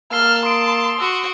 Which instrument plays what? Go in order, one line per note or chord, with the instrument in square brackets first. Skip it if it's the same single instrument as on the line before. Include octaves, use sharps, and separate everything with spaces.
[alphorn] A#3 [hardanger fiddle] A5 [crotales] E6 C7 G7 [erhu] F6
[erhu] C6 [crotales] D#6 D7
[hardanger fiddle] F#4 [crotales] E6